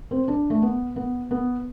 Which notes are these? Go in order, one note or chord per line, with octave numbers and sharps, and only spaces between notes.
C4
D4
A3
B3
B3
B3